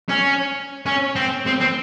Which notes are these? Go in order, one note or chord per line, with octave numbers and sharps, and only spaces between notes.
C#4
C#4
C4
C4
C4